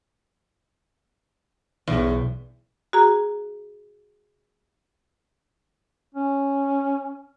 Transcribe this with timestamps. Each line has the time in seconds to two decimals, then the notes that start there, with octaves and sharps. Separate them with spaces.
1.88 B1 E2
2.93 F#4 G#4 A#5
6.15 C#4